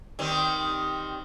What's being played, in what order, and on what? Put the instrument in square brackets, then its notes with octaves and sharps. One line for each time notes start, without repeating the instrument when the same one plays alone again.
[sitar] D#3 G3 C4